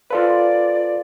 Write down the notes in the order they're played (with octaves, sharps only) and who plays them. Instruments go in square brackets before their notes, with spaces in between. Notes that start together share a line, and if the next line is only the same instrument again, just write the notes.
[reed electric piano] F4 A4 B4 [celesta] C5 F5 C6 [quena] D5